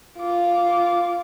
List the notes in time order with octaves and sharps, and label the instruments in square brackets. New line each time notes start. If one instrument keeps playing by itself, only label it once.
[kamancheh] F4 D6